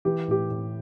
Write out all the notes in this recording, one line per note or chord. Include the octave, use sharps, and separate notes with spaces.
E3 G4
A2 G4
A2